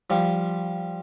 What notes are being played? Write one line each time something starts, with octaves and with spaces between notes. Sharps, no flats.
F3 G3